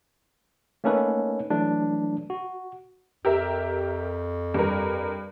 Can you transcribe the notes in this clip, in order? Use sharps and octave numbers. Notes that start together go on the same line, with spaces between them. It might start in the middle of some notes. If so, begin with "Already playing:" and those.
A3 A#3 C#4 D#4 A4 B4
E3 F#3 A3 D4
F#4
F2 G4 A#4 E5
G2 A#4